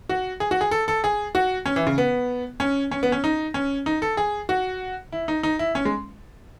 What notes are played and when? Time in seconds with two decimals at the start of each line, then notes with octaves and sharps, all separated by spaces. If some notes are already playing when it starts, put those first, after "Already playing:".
0.09 F#4
0.40 G#4
0.51 F#4
0.61 G#4
0.71 A4
0.88 A4
1.04 G#4
1.35 F#4
1.66 C#4
1.76 E3
1.87 C#3
1.98 B3
2.60 C#4
2.91 C#4
3.03 B3
3.12 C#4
3.24 D#4
3.54 C#4
3.86 D#4
4.02 A4
4.17 G#4
4.49 F#4
5.13 E4
5.28 D#4
5.43 D#4
5.59 E4
5.75 C#4
5.85 G#3